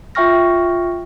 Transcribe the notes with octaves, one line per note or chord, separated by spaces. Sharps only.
F4 E5 G5 C#6 F6 A#6